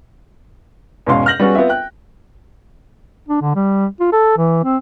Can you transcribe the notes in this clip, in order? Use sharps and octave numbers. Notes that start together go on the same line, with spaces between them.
E2 G#2 B2 C#4 F5 C6
F6 G6 A#6 F#7
G3 B3 C#4 F#4 G#4
B3 C4 F4 E5
G5 F#6
D4
D3
G3
F4
A4
E3
C4